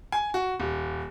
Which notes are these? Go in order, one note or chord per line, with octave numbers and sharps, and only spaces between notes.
G#5
F#4
D#1